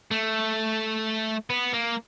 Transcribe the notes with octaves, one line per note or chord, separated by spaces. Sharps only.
A3
B3
A#3